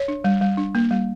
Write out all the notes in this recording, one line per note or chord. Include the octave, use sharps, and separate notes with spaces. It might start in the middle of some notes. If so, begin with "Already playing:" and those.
Already playing: C#5
D4
G3
G3
D4
A#3
G3